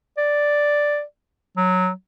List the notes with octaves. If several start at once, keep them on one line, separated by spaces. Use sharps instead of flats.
D5
F#3